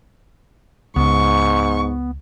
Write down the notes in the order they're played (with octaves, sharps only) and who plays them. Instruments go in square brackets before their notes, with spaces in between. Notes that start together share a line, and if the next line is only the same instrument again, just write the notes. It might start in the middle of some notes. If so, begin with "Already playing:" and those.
[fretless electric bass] C#2 [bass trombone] G#2 [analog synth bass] B3 [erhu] C#6